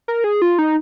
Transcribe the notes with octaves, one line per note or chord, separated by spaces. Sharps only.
A#4
G#4
F4
D#4